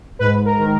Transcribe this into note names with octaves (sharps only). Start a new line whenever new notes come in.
G#2 B4
A#4
D#3